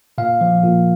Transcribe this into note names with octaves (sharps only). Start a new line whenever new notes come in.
A#2 F5
F3
A#2